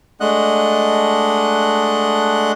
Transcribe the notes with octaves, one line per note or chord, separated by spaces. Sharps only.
G#3 A3 D4 D#5 F#5 F#6